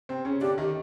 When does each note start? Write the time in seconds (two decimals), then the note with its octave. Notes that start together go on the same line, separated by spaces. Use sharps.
0.09 C3 C4
0.25 C#3 C#4
0.41 D3 D4 G4
0.58 D#3 D#4